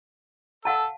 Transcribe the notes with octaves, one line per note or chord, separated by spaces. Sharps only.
A4 F5 F#5 A5 E6